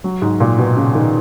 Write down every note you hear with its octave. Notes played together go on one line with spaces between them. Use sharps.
F#3
G#2
A#2
B2
C#3
D#3